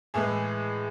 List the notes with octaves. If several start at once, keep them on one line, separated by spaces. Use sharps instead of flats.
A2 E3 G#3 G#4